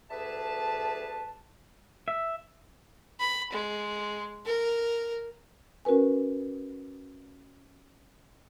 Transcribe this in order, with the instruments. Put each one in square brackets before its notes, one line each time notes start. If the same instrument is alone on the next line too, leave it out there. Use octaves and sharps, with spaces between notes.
[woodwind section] D2 G3 G#4 B4 E5 A5
[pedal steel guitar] E5
[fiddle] B5
G#3
A#4
[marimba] C#4 F#4 A#4 B4 G#5